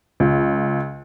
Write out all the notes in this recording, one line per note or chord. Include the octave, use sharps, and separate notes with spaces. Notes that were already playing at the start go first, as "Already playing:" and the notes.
C#2